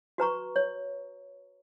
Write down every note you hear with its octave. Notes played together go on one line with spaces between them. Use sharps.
F#4 B4 A#5 C#6
C#5